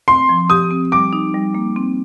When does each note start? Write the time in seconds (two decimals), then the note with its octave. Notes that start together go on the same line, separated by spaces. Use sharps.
0.08 C4 C6
0.29 F3
0.50 G4 D#6
0.71 C4
0.92 G3 D6
1.13 D#4
1.34 G3
1.55 A#3
1.76 C4